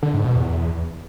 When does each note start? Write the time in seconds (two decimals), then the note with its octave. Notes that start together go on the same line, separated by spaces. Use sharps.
0.03 D3
0.14 G#2
0.25 B2
0.36 E2